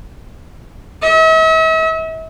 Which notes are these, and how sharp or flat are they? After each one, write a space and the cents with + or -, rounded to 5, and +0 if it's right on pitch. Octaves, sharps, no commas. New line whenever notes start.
E5 -45